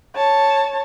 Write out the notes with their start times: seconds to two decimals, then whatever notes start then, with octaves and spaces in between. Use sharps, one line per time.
0.16 C#5 A5